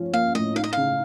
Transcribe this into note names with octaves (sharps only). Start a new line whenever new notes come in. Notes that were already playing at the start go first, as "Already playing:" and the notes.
Already playing: F3 C#4
A#3 F5
A2 D#5
D#4 F5
D#5
C#3 F5